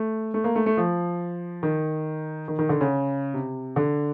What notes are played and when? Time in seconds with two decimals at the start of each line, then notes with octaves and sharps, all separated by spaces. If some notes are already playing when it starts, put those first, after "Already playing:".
Already playing: A3
0.34 A3
0.44 A#3
0.55 A3
0.66 A3
0.77 F3
1.63 D#3
2.48 D#3
2.59 D#3
2.69 D3
2.81 C#3
3.34 C3
3.76 D3